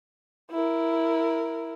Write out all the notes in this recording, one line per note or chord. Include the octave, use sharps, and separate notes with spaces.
E4 A#4